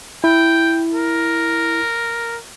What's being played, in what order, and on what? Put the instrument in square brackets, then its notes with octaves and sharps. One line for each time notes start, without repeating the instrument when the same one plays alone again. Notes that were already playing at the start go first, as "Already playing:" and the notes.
[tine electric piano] E4 [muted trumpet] G5
[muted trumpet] A#4